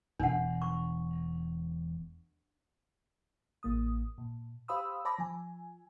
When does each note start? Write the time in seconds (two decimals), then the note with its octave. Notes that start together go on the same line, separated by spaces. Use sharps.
0.20 E1 D4 F#5
0.62 C#6
3.63 A1 A#3 D#6
4.18 A#2
4.68 G4 C5 F5 B5 D#6 E6
5.05 C5 A5 B5 D6 A#6
5.18 F3 G#5